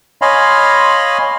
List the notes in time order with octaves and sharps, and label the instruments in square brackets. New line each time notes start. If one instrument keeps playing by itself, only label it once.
[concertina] C#5 D#5 F5 G#5 B5 C6